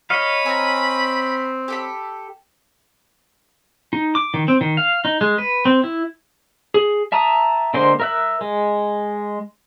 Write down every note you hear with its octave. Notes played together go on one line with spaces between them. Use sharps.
C#5 D#5 F5 B5
C4 G#5 A#5
G4 A4 B5
D#4
D6
D#3
C4
D#3
F5
D#4
G#3
B4
C4
E4
G#4
E5 A5 A#5 D#6
D3 G#3 A#3 C5 C6
A#4 E5 F#6
G#3